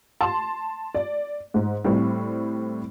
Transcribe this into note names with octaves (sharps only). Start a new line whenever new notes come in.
A5 C6
D5
G#2
A2 G3 C4